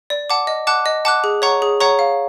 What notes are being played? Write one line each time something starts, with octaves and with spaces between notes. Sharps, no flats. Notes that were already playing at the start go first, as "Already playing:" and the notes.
D5
F#5 A5 D6
D#5
F#5 A5 D6 F#6
D#5
F#5 A5 D6 F#6
G#4
C#5 F#5 A#5 C#6
G#4
C#5 F#5 A#5 C#6
F5